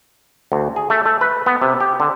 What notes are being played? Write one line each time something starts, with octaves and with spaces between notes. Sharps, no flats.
D2
G#4
A3
A3
B4
B3
C3
G4
D3